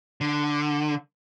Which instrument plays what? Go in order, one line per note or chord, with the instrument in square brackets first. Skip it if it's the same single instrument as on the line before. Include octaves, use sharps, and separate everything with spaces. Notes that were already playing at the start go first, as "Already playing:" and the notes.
[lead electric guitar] D3